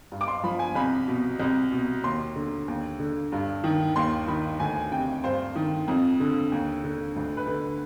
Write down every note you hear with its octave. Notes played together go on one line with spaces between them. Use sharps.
G2
D6
C6
F3 B5
G#5
C2 B5
B2
C2
B2
D#2 C6
D3
D#2
D3
G2
D#3
D#2 C6
D#3 B5
D2 G#5
C3 G5
G2 C5
D#3
F2
D3
D#2
D3
D2
B4
D3